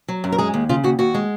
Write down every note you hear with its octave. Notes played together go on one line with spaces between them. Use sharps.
F#3
F#2
A#4
G#3 G#4
D#2
C#3 F4
D#2 F#4
D#2 F#4
G#3